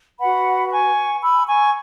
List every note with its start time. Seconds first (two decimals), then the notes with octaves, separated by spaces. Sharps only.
0.19 F#4 B4 F#5 B5
0.70 G#5 C#6
1.22 B5 E6
1.47 G#5 C#6